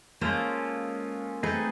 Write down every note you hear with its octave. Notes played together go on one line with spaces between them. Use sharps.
G#3 A#3 C#4 F4 A4 C5
A3 C4 D#4 G#4 B4